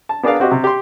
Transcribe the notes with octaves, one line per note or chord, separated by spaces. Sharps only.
A5
B3 D4 G#4 A#4 D5 F5
C4 F#4 G4 D#5
C3
G4 C6